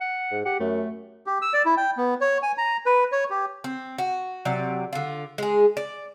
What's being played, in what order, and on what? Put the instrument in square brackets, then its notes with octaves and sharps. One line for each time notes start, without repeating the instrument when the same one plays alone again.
[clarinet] F#5
[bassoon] G#2
[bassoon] G4 [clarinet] F#5
[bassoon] F#2 [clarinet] A3
[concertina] G4
E6
D5
E4
G5
B3
C#5
G#5
A#5
B4
C#5
G4
[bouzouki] C4
F#4
C3 F#3 D5
D3 F4
G#3 G#4
D5